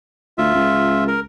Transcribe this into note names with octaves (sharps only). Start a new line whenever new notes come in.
D2 F4 E5
C#2
A#4